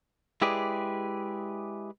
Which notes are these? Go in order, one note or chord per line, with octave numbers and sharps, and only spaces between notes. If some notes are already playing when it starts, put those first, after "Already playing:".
G#3 E4 G4 G#4 B4 D5